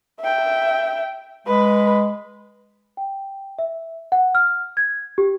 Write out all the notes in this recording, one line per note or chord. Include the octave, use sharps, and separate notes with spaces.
E5 G5
G#3 B4 B5
G5
E5
F#5
F6
G#6
G4